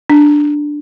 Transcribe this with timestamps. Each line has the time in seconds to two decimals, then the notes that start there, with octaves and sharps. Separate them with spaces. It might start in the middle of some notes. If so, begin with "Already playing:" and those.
0.10 D4